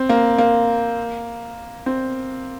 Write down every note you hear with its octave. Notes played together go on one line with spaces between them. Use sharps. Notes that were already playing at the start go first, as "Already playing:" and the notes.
Already playing: C4
A#3
A#3
C4